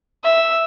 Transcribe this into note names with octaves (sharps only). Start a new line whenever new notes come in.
E5